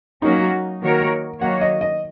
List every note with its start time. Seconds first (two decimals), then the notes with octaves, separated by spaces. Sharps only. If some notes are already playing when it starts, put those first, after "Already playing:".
0.22 F#3 A#3 C#4 D#4 F#4
0.82 D#3 A#3 F#4 A#4 C#5
1.41 D#3 F#3 A#3 F#4 C#5 F#5
1.61 D#5
1.81 D#5